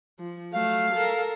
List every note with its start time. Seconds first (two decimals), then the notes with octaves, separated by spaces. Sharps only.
0.19 F3
0.53 F#3 A3 F5
0.94 A4 A#4